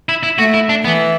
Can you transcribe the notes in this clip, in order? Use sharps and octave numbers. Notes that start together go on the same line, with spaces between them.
E4
E4
A3 F#4
E4
D4
E3 B3